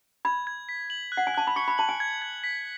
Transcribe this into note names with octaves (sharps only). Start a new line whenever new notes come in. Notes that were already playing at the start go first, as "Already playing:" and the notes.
B5 G#6
G#6
B6
F#7
F#6
F#5
G#5
A5 F#6
B5
C#6 C#7
B5
A5 F#7
G#5
G#6
G#6
B6